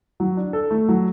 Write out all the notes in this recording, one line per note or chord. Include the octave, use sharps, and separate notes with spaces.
F#3
D4
A4
A3
F#3